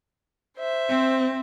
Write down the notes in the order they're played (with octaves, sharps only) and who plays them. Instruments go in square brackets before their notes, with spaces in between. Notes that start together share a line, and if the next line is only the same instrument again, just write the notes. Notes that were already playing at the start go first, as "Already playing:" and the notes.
[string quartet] C5 E5
[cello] C4